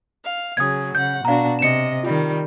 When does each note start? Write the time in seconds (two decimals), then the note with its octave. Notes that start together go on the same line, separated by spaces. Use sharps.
0.24 F5
0.57 C#3 F#3 G#4 D#6 G#6
0.95 C#3 F#5 G6
1.25 B2 D4 F#4 F5 A#5
1.59 C3 D#5 C#7 E7
2.03 D#3 G3 F4